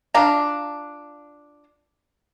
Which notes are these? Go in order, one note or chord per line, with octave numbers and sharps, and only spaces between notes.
D4 F4 F5 A#5